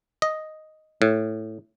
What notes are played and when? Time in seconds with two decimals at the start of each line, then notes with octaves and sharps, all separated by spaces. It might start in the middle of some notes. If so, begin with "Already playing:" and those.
0.22 D#5
1.02 A2